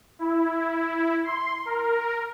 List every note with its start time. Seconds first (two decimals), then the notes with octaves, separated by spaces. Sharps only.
0.19 E4
1.24 C6
1.65 A#4